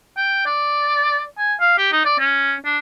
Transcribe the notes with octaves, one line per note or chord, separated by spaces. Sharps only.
G5
D5
G#5
F5
G4
D#4
D5
C#4
D4